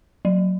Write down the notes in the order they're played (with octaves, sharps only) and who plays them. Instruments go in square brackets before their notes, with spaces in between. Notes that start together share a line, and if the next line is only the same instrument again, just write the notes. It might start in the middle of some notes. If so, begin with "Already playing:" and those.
[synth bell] F#3